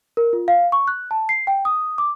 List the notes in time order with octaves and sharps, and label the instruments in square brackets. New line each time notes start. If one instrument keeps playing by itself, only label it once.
[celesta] A#4
F4
F5
C#6
F#6
A5
C7
G5
D#6
D6